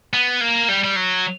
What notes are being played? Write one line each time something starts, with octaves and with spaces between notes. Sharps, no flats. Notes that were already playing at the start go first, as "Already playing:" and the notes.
B3
A#3
G3
G3
F#3